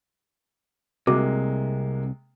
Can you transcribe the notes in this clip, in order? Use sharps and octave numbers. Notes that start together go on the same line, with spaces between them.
C2 C3 G#3 A#3 F#4 A#4 D6